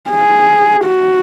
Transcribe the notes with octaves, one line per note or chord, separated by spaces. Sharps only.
G#4
F#4